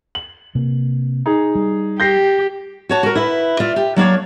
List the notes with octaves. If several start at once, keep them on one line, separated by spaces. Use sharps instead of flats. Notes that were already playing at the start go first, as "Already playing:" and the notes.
F#7
C3 A#3
D#4 G#4
G3
G4 G6 A#6 C7
F#4 C#5 A5
F#4 A#4
E4 B4
F4 D5 E5
G4
F#3 A#3 D4 C#5